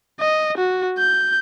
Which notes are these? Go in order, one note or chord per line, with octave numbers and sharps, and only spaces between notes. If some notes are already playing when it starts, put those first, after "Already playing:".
D#5
F#4
G6